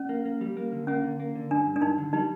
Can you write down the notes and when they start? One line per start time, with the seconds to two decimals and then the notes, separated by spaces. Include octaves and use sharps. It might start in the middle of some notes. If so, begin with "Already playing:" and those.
Already playing: C#4
0.09 A#3
0.25 A#3
0.41 G3
0.57 A#3
0.72 D3
0.87 A#3 C#4
1.04 D3
1.20 A#3
1.36 D3
1.51 G2 D4
1.66 G2
1.76 D4
1.82 G2 D#4
1.98 D3
2.13 G3 D#4